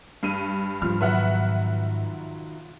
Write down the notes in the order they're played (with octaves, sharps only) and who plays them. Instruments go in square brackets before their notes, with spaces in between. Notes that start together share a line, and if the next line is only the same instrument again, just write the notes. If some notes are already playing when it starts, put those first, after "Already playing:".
[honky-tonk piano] G2 D#7
[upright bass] G#2 [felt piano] F3 F6
[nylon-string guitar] B2 D#3 F#3 [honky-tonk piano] B4 E5 F#5